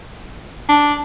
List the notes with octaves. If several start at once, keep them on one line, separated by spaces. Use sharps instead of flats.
D4